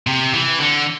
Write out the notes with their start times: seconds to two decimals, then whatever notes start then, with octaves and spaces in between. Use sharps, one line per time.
0.07 C3
0.33 E3
0.60 D3